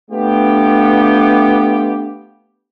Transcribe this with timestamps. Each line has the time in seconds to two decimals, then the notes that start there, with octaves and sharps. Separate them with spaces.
0.11 A3 B3 D4 F4 G4 G5